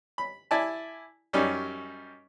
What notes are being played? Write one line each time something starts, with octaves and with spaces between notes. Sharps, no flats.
B5
E4 D5 G#5 A5
F#2 G3 C#4 D#4 D6